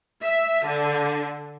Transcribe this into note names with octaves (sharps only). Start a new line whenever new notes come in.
E5
D3